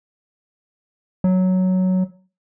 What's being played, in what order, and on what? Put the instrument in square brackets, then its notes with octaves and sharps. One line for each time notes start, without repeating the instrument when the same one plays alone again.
[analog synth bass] F#3